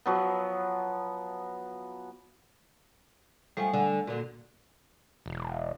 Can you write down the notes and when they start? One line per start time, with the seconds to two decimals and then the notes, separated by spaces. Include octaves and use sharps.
0.06 F3 F#3 B3
3.57 F3 G3 A3 F#5 G#5
3.73 D3
4.07 A#2 D3 F#4
5.26 E1